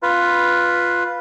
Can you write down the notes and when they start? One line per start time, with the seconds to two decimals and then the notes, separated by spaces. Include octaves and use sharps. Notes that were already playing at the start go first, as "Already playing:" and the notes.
0.02 F4 B4